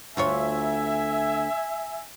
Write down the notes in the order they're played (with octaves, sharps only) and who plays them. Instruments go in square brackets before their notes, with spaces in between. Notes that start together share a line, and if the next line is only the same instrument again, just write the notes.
[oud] D2 F4 C#5 [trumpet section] E5 G#5